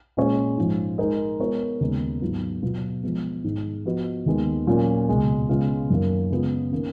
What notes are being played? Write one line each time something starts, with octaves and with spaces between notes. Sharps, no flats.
A#2 G#3 C#4 G#4 C#5
G#2 F3 G#3
G#3 D#4 A#4 D#5
G#3 B3 F4 A#4 C#5
D#2 C#3 G#3 B3 D#4
G#2 F#3 B3 F4
B2 F#3 B3 F4
F3 G#3 B3
G#2 D#3 G#3
F3 B3 F#4 B4 D#5
D#2 D#3 G#3 B3
A#2 F#3 A#3 C#4 F4
C#2 B2 G#3
C#3 G#3 B3 F4
F#2 D#3 F#3 A#3
C#3 G#3 B3 F4
D#3 A#3 C#4